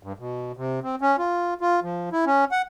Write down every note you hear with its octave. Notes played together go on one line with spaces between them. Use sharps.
G2
B2
C3
C4
C#4
F4
F4
F3
E4
C#4
F#5